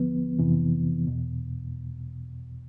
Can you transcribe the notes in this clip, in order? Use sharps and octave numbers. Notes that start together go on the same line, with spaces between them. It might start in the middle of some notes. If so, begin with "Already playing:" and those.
Already playing: D#2 D3 F3 B3
F2 C3 E3
E2 B2